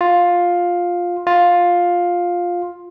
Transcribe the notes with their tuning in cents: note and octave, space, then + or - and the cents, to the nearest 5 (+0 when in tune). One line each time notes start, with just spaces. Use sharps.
F4 +10
F4 +10